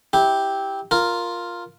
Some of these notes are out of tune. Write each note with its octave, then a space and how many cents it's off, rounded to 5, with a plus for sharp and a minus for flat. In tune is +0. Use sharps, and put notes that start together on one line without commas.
E4 -20 G4 +0
F4 +0 A#4 +0